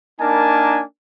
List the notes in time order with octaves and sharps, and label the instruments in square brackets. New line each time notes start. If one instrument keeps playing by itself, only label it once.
[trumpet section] A#3 D4 D#4 A#4 G#5 A5